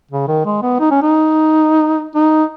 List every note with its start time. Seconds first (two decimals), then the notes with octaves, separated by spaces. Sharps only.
0.11 C#3
0.28 D#3
0.45 G#3
0.62 B3
0.80 D#4
0.91 C#4
1.02 D#4
2.15 D#4